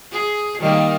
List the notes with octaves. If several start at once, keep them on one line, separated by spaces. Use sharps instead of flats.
G#4
D#3 G3 A#3